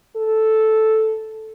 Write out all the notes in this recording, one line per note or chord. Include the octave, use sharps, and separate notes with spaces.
A4